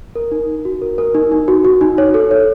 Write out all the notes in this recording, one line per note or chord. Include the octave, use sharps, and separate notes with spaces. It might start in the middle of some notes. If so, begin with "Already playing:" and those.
A#4
D#4
D#4
F#4
A#4
A#4
D#4
D#4
F#4
F#4
D#4
C#5
A4
C#5